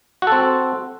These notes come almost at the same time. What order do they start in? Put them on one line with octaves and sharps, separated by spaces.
F#4 A4 C4